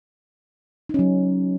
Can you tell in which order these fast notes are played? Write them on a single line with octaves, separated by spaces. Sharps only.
D#4 C#4 F#3